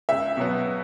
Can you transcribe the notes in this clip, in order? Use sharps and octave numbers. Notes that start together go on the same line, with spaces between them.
C#2 E5
B2 F#3 B3